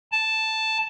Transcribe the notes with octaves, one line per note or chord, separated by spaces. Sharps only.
A5